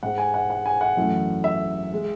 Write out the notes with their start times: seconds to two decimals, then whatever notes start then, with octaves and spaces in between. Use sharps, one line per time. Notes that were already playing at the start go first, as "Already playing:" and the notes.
0.03 G#2 G#3 F#5
0.18 G#5
0.34 F#5
0.50 F#5
0.66 G#5
0.81 F#5
0.97 F#2 E3 A3
1.44 E5
1.94 G#3